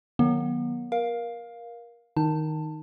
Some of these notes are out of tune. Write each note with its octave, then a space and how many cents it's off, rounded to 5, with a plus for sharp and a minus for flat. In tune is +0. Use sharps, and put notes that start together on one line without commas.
D#3 -25 F#3 -10 B3 -35
A#4 +20 F5 +5
D#3 +0 D#4 +0 A5 +15